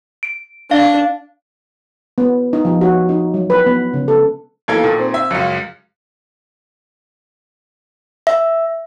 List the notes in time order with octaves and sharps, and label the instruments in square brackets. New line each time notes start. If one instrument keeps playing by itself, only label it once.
[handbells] D7
[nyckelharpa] D4 [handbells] F5
[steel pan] B3
D#4
F3
F#4
D#4
F#3
B4
B3
C#3
A4
[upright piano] B1 E3 G#6 [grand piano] A#3 A4 F5
[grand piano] A#2 D#3 [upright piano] A4
[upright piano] C4 C5
[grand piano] E5
[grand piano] C#2 F#2 [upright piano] F5 C#7
[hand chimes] E5